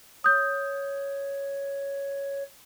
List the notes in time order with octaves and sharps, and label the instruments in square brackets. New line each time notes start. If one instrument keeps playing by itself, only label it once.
[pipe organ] C#5 [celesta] D#6 G6